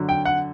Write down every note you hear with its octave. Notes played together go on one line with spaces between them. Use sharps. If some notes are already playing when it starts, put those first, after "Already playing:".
Already playing: F#2 D3 F#3
G5
F#5